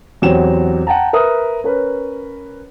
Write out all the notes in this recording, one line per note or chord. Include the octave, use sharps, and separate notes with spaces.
E2 F#3 C4 G4 E7
F#5 G5 A5 A#5
A#4 B4 E5 D#6
C#4 A#4 B4